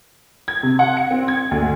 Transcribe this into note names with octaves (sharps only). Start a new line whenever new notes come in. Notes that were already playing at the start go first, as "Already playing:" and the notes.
G#6
C3
F#5
C#7
C4
G#6
D2